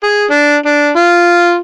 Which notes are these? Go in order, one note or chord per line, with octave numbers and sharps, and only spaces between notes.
G#4
D4
D4
F4